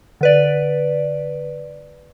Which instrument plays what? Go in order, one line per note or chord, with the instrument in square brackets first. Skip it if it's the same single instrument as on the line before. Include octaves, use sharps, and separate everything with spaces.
[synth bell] D3 B4 D5